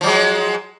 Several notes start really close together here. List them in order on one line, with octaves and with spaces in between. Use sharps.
F3 F#3 G#3